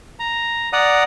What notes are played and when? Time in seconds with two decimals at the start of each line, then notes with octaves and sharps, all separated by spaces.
0.19 A#5
0.73 D5 F#5 A#5 D#6